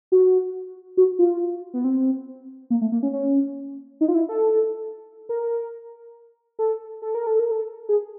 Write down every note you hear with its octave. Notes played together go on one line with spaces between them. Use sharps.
F#4
F#4
F4
B3
C4
A#3
A3
A#3
C#4
C#4
D#4
F4
E4
A4
A#4
A4
A4
A#4
A4
A#4
A4
G#4